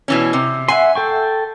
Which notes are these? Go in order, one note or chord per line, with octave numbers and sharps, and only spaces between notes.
B2 E3 C#4
C3
E5 F#5 G#5 C6
A4 G5 C#6